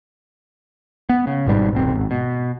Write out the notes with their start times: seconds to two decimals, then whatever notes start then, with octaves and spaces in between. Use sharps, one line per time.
1.09 B3
1.27 C#3
1.46 G#1 G#2 B2 G3
1.73 D#1 B1 C4
1.94 G#1
2.11 B2